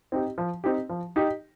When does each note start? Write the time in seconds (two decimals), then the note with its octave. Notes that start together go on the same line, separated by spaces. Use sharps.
0.12 C4 D#4 G4
0.38 F3
0.64 C4 D#4 G4
0.90 F3
1.16 D#4 G4